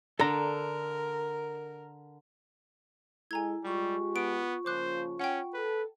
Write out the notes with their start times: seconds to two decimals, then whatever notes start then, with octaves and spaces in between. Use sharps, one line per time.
0.20 D3 A4 A#4 A#5
3.31 G#3 E4 A4 G#5 A#5 G#6
3.65 G3 G#3 F4 G4 C#6
4.16 B3 D7
4.66 C#3 F3 A#3 C5 D6 F#6
5.20 C#4 F#5 G5
5.54 A4 B4